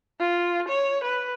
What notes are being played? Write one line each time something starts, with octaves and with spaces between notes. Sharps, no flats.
F4
C#5
B4